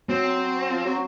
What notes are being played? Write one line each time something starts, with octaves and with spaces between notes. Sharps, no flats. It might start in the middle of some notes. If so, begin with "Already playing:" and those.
F#3 C4
F3
F#3